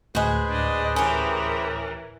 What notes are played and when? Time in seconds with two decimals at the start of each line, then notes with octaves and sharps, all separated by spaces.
0.15 D2 A2 G#3 F#4 G#4 B4 C5
0.49 D4 D#5
0.96 E3 C#4 G4 A#4